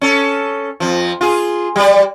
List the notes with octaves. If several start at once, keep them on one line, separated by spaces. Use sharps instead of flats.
C#4 A4
F2 F3
F4 G#4
G3 D5